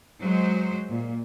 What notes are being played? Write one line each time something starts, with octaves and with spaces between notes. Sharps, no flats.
F#3 G#3 C5
A#2